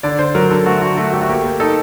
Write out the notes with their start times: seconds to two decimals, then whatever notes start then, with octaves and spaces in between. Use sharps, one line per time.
0.03 D3 D5
0.19 D3 C5
0.35 F#3 A#4
0.50 D3 A4
0.66 A3 F#4
0.82 D3 F#4
0.97 A3 F#4
1.13 A3 G4
1.22 F#4
1.29 A#3 G4
1.44 A#3
1.60 D#4 A4